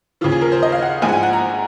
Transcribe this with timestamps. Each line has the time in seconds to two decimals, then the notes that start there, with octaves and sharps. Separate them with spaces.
0.21 D#2 C#3 F3 F4
0.32 G#4
0.41 A#4
0.52 C5
0.63 D#5
0.72 F5
0.82 F#5
1.02 A#1 G#2 F3 G#3 G#5
1.09 F#5
1.13 G#5
1.23 F#5
1.33 A#5